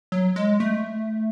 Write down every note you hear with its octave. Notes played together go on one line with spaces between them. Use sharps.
F#3
G#3
A3